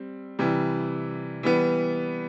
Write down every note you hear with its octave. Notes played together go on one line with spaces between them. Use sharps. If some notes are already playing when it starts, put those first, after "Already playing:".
Already playing: G3 C4
C3 E3 G3
E3 G3 B3